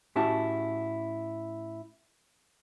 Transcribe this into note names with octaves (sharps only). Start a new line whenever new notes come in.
A2 C#4 E4 F#4 G4 A5